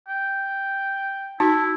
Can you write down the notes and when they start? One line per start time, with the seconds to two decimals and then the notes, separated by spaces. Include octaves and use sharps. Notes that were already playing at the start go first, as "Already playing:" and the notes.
0.08 G5
1.40 D#4 E4 F#4 A5